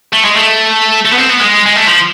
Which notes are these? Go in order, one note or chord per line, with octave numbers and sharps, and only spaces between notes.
A3
G#3
A3
A3
B3
C4
B3
G#3
G#3
A3
F3